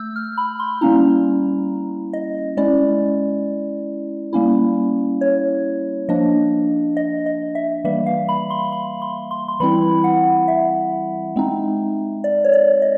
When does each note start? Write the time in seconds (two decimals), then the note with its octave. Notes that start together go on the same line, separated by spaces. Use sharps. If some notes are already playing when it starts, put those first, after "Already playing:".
Already playing: A3 E6 G6
0.16 F6
0.38 B5
0.60 C6
0.81 G3 A#3 C#4 E4 A#5
2.13 D#5
2.57 G#3 C#4 E4 D5
4.33 G3 A#3 C#4 E4
5.21 C#5
6.09 F3 A#3 D4 D#5
6.97 D#5
7.26 D#5
7.55 E5
7.84 E3 G3 A#3 E5
8.06 F5
8.29 B5
8.50 C6
8.72 B5
9.02 C6
9.31 C6
9.48 C6
9.60 E3 G3 C4 E4 B5
10.04 F#5
10.48 E5
11.36 G#3 C4 D#4
12.24 D5
12.44 C#5
12.53 D5
12.82 D#5